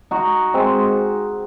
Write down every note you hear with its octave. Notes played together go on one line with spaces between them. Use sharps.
D#4 F#4
G#3 C4